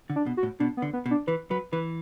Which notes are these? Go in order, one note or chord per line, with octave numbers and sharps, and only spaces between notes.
D3
D4
B2
F#4
A2
B2 D4
B3
D3
B3
B2
D4
E3 B4
F#3 B4
E3 B4